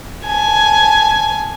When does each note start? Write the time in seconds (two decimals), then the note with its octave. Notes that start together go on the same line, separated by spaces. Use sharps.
0.25 G#5 A5